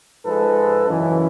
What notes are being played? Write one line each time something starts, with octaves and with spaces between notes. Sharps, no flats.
G#2 F3 G#3 A4 B4
F#2 C#3 E3